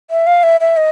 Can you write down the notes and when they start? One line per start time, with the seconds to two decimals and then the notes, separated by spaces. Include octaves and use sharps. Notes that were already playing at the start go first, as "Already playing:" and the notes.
0.11 E5
0.27 F5
0.43 E5
0.61 E5
0.77 D#5